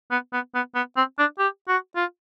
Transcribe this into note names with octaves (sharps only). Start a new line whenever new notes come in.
B3
B3
B3
B3
C4
D4
G4
F#4
F4